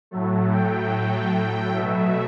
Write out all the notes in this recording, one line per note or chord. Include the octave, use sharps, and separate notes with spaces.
A2 F#3 A3
G5
G5
B2 F#3 A3 E5